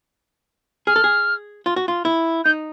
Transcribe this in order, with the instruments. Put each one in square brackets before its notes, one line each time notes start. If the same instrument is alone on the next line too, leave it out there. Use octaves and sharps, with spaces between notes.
[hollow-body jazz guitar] G#4 [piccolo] F6
[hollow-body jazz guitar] A4
G#4
F4
F#4
F4
E4
[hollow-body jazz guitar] D#4 [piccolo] G6